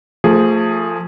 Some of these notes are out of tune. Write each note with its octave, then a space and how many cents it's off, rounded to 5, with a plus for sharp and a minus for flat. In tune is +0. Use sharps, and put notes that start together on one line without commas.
F3 +0 A3 +30 G#4 +0